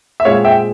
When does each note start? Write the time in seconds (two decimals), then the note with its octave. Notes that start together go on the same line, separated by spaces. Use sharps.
0.20 E5
0.25 A#2 G#3 C4 C#5 F5
0.45 E5 G5